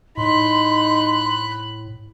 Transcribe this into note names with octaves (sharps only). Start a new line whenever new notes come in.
A2 D#4 B5 C6 F#6